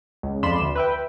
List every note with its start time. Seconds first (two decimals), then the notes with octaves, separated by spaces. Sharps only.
0.23 C#2
0.43 F2 D5 B5 C6 E7
0.62 D2
0.75 B4 E5 G5